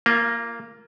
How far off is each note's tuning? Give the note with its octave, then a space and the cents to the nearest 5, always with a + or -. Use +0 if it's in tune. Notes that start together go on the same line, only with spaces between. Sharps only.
A#3 +0 F4 -30